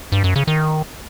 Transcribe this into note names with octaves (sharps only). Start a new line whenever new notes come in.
G2
F#2
C#3
D#3